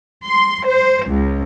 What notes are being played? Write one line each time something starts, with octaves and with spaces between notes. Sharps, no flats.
C6
C5
C#2